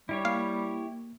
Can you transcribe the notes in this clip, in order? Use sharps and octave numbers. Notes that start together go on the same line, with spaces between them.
G3 E4 G4 C#5
A#3 F5